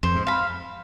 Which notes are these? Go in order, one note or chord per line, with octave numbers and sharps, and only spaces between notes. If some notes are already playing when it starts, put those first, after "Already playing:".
F2 C5
G#2
F5 B5